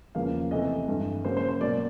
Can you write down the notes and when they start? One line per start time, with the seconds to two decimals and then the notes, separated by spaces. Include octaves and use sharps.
0.15 E2 C#3 F3 A#3 F5
0.51 C3 E3 A3 C4 D#5
0.88 G2 E3 A3
1.24 C#3 F#3 A#3 C5
1.37 C5
1.49 C5
1.61 B2 F#3 A#3 D5